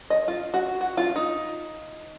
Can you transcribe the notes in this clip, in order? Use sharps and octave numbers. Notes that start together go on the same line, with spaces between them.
D#5
F4
F#4
F#4
F4
D#4